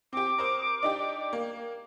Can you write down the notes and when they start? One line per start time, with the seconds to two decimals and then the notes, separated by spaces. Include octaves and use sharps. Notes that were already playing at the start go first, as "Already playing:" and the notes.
0.13 C4 G4 D6
0.38 A#4 C5 D#6
0.83 D4 D#4 G4
1.33 A#3